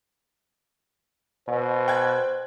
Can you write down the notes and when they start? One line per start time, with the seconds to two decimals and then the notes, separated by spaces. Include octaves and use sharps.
1.48 B2 C5
1.88 G5 F#6 G#6